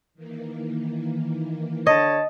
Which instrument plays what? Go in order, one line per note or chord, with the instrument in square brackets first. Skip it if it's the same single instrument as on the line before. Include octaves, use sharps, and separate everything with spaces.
[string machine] D#3 E3 A#3
[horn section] D3 C#5 A5 [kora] D#5